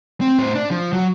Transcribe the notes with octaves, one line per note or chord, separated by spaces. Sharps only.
C4
A2 C5
D4
F3
F#3